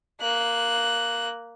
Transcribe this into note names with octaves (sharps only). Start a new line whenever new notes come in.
A#3 F#6